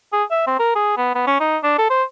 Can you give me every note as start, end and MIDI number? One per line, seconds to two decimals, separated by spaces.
0.13 0.24 68
0.31 0.43 76
0.47 0.56 60
0.59 0.72 70
0.76 0.95 68
0.97 1.10 59
1.15 1.24 59
1.27 1.36 61
1.40 1.58 63
1.64 1.75 62
1.78 1.90 69
1.90 2.03 72